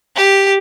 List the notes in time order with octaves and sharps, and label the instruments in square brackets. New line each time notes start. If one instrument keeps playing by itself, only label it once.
[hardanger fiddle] G4